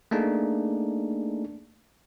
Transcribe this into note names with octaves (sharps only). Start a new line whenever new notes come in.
A3 A#3 D4 D#4 G#4